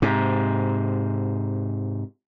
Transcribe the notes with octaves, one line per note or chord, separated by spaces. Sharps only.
G#2 C3